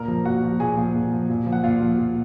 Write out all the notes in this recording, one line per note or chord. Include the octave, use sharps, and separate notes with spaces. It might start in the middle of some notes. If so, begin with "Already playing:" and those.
Already playing: A#2 A#4 A#5
F3
A#2 F#4 F#5
F3
A#2 G#4 G#5
F3
A#2
F3
A#2
F3
F#5
A#2 F4 F5
F3
A#2